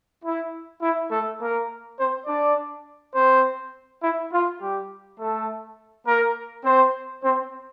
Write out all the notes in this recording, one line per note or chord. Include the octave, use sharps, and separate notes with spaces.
E4
E4
A3 A4
A#3 A#4
C4 C5
D4 D5
C4 C5
E4
F4
G3 G4
A3 A4
A#3 A#4
C4 C5
C4 C5